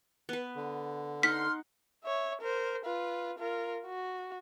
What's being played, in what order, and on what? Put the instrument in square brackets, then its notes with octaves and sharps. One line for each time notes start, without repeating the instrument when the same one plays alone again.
[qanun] B3 B4
[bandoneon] D3
[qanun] D#4 F#5 [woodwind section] C6 F6 [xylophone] B6
[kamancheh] C#5 E5
A#4 C5
F4 B4
F4 A#4
F#4